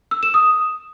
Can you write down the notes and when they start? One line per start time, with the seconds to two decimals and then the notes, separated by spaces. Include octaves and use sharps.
0.11 E6
0.23 E7
0.34 D#6